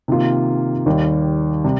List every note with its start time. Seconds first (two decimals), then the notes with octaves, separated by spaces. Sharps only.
0.08 C3 D#3 A#3 F4
0.86 D#2 D#3 G3
1.65 C3 G3